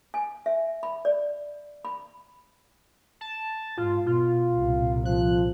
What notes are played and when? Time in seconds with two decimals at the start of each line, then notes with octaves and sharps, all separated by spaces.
0.14 G#5
0.46 E5
0.83 B5
1.05 D5
1.85 B5
3.21 A5
3.78 G#2 F4
4.06 B2 F4
4.53 C2 A#2
5.05 F3 F#6